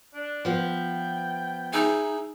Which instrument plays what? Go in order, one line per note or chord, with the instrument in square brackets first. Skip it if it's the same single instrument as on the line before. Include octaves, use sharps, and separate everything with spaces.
[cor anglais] D4
[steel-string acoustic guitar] F3 B3 [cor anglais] G5
[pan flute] D#4 [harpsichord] E4 G#4